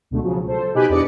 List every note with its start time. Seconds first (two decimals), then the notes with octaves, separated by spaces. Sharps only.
0.11 C#2 B2 D3 G#3 A3
0.22 C#3 F3 F#3
0.47 A4 C5
0.74 B2 D#4 G4 G#5 B5 F#6
0.89 E2 D4 D5 D#5 C#7